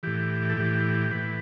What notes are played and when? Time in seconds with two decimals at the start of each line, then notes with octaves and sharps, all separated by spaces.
0.03 A2 E3 G4
0.50 A4
0.57 A2 E3 G4
1.11 A2 E3 B4